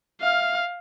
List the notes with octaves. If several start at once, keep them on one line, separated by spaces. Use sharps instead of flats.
E5 F5 F6